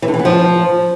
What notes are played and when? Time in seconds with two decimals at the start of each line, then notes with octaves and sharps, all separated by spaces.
0.02 E3
0.08 D3
0.14 E3
0.19 B3
0.25 F3